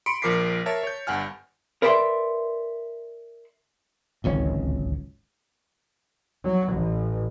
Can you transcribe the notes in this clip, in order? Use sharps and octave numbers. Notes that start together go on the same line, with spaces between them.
B5 C6 C#7 D7
A#1 F3 A#4 D6 B6 C7
A#4 C#5 E5 A5 A6
C#5 G6
G1 G2 F#5 G#5 F6
A#4 B4 D5 E5 B5 C6
D1 G#1 C#2 C#4
F#3
A1